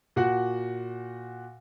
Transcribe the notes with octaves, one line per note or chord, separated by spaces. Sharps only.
A#2 F#4 F#5